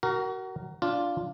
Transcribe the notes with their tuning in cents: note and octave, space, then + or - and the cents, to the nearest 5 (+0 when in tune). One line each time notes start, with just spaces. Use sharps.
F#4 +30 A#4 +0
D4 -5 F4 +0